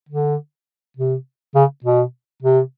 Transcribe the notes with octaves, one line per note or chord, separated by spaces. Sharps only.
D3
C3
C#3
B2
C3